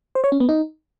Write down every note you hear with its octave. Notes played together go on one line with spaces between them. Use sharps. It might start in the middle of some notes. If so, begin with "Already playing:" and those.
C5
C#5
C#4
B3
D#4